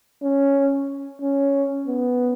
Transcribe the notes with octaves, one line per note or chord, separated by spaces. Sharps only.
C#4
C#4
B3